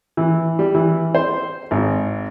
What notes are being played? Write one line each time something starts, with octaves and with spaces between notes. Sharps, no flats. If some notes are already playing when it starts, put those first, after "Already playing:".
E3
G3
E3
C5
G#1